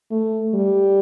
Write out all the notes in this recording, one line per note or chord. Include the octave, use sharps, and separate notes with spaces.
A3
G3